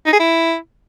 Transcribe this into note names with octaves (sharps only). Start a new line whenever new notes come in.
D#4
G#4
E4